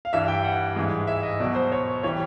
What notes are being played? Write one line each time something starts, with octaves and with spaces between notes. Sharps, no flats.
F5
G2 E3 G3 E5
G5
F#5
G#2 E3 G#3
E5
D#5
B2 F#3 D5
C5
C#5
E3 G3 C#5